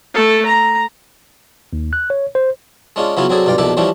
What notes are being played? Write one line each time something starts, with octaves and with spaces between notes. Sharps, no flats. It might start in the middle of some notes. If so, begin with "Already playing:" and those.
A3 A4
A#5
D#2
F#6
C#5
C5
G#3 C#4 D4 F4
C#3 F#3 B3 C#4 E4 F4
F#3 C4 D4 G#4 A4
B1 G2 F4 D5 G5
A#1 B2 E4 A4 B4 D5
E3 F3 G3 C#4 D4 E4